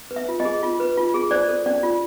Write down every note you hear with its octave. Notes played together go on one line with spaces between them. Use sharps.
B4
E5
F4
D#5
G#4
F4
B4
F4
G#4
C5 D5
A4
C#4 D5
F4